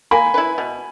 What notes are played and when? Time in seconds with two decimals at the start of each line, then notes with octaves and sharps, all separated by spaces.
0.11 A#3 G#5 B5
0.34 E4 B4
0.58 B2